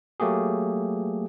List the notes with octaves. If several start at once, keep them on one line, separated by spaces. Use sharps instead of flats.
F#3 A3 A#3 G4 G#4